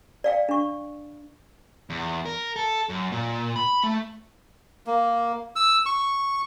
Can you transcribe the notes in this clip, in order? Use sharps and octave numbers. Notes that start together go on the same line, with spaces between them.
D5 F5 G5
D4 C#6
E2
A#4
A4
F#2
A#2
B5
A3
A#3
E6
C#6